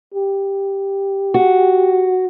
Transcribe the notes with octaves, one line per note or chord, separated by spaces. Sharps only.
G4
F#4